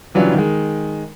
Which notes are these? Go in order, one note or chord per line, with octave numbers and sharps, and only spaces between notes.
C#3 E3 F#3 G3 D4 F4
D#3 G#3